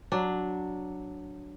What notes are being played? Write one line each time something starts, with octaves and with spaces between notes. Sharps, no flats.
F#3 D4